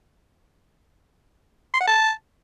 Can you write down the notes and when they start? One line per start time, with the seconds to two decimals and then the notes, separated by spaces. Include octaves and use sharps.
1.74 C6
1.81 F#5
1.88 A5